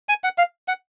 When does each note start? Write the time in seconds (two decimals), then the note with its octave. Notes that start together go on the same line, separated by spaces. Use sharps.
0.09 G#5
0.24 F#5
0.38 F5
0.68 F#5